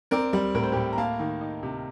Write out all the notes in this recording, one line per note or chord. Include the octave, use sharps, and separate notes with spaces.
C4 A#4 D5
G3
A2 A#4
C5
A2 G4 A#4
A#5
A#3 F5 A5
D#3
D#4
C3